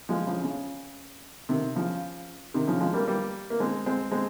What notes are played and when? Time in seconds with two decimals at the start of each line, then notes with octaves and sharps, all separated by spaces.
0.09 F3 G#3
0.27 C#3 F3
0.44 C#3
1.49 C3 D#3
1.75 C#3 F3
2.54 C3 D#3
2.67 C#3 F3
2.81 F3 G#3
2.94 G3 A#3
3.07 G3 A#3
3.50 A#3
3.60 G#3 C4
3.86 G#3 C4
4.12 G#3 C4